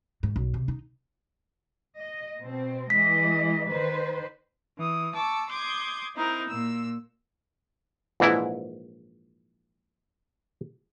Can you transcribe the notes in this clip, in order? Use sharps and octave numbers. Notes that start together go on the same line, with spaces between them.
G#2
B1
C3
D#4
D#5
B2 C4
E3 G#3 D#5 B6
D#3 B4 C5
E3 D#6
A5 C#6 D6 E6
C6 D6 D#6 G6 G#6
C4 D#4 E4 A#4
A#2 E6
A#1 G#2 E3 E4